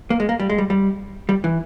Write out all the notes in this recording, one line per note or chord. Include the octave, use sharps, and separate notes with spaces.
A#3
G#3
A#3
G3
G#3
G3
G3
G3
E3